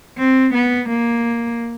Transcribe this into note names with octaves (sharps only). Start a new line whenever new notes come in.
C4
B3
A#3